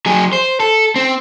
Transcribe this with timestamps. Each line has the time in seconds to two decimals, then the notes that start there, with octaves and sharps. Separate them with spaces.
0.06 F#3 G#4
0.33 C5
0.60 A4
0.96 C4